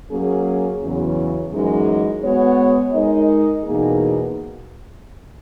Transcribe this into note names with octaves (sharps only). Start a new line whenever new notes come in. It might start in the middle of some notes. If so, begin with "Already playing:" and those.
F#3 A#3 C#4 G#4
E2 C#3 F#3
F#2 E3 G#3 D#4 G#4
G#3 B3 F#4 C#5
G#3 D#4 A#4 D#5
E2 B2 A#3 D#4 G#4